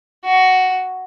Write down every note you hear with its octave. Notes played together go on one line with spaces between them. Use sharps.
F#4